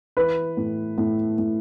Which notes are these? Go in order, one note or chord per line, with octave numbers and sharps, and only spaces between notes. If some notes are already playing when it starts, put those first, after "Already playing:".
E3 B4
A2
A2
A2